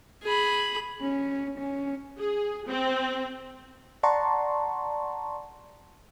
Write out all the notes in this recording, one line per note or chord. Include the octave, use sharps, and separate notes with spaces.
G#4 B5
C#4
C#4
G#4
C4
D5 F#5 A5 A#5 C6 C#6